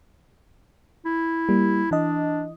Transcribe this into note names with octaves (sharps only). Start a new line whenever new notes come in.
E4
G3 A#3
E3 D4 D#5